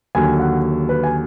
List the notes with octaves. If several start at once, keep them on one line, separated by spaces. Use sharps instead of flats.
D#2 D3 F#3 G#5
F#5
B4
G#5